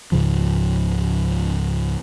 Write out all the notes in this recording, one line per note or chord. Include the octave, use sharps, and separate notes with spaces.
C#2 G#2 C#3 F3